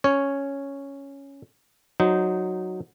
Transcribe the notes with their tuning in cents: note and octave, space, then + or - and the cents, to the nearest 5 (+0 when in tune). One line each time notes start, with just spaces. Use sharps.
C#4 +0 C#5 +0
F#3 +0 D#4 +0 C5 -20